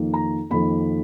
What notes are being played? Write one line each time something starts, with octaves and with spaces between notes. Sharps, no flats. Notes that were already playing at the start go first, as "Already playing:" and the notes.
Already playing: F2 D#3 A#3
A#5
F2 D#3 A#3 B5